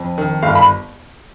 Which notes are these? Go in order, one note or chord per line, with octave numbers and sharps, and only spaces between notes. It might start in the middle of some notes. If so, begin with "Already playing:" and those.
Already playing: F2
D#3
G1 F5
B5